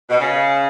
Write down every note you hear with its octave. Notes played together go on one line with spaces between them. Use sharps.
B2
C#3